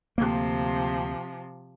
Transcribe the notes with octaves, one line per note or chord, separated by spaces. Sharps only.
D2 C3 F3 A#3